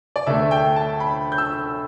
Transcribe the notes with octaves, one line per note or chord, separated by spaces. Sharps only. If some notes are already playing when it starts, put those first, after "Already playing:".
D5
D2 D3 A3 E5
G5
A5
B5
G6
E6